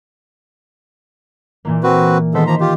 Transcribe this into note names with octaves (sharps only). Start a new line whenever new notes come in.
A#2 E3 A#3
C4 F#4 B4
D#3 G#3 B3 A4 C5 B6
F3 A#3 A#5
F4 G4 G6